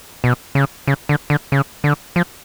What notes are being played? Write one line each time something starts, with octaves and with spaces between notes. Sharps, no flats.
B2
C#3
C#3
D3
D3
C#3
D3
F3